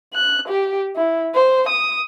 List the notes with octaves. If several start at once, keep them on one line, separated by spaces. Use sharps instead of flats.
F#6
G4
E4
C5
D#6